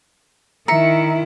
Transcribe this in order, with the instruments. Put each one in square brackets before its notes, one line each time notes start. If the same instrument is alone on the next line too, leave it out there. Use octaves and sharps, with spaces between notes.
[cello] D#3 E4 [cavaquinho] E5 [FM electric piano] A#5 C#7